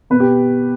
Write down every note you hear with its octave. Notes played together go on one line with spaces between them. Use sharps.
B2 B4
G4